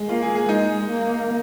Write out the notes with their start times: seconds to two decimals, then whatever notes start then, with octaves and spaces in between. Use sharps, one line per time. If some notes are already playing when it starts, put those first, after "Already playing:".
Already playing: G#3
0.08 A#3 F4
0.22 G#4
0.35 G#4
0.48 G#3 D#4
0.89 A#3